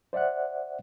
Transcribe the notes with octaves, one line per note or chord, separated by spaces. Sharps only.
C5 D5 E5 F#5 F#6